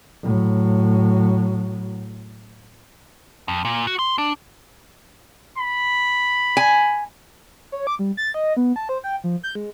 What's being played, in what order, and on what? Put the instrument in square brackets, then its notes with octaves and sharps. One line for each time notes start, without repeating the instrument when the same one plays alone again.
[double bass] A2 F#3
[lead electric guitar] F2
A#2
F#4
C6
D4
[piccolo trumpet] B5
[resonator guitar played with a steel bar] G#5
[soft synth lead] C#5
D6
G3
A6
D#5
B3
A5
C5
G5
F3
G6
G#3